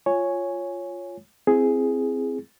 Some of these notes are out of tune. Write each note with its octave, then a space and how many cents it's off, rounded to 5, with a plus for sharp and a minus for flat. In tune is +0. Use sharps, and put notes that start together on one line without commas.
F4 +0 C#5 +0 G#5 +0
C4 +0 E4 +25 G#4 +0